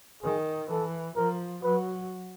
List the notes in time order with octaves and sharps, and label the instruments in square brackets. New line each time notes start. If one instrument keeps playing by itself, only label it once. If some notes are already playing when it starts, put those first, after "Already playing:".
[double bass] D#3 [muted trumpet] G#4
[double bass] E3 [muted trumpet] A4
[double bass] F3 [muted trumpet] A#4
[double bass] F#3 [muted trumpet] B4